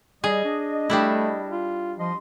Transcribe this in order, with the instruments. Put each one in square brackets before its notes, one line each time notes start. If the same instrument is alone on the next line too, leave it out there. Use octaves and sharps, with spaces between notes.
[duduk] G3 [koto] G#4 [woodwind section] D#5
[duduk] D4
[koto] G3 D4 E4 [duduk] A3
[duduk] F4
[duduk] F3 [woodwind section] D#5 C6